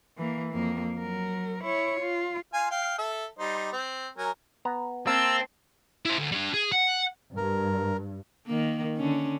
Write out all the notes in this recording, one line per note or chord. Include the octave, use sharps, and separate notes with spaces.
E3 A#3
F2 A#3
F#3 A#4
E4 C#5
F4
F4 F5 G#5
F5 G5 F6
A4 E5
G3 D#4 C5
C4
F#3 A#4 G#5
B3 A#5
A#3 C4 A5 E6
E4 C5
D2
G3 D4
G#4
F#5
G2 A#4
D#3 A#3
D3 C#4